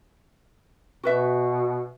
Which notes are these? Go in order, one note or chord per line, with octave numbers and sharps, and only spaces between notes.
B2 F#4 B4 E5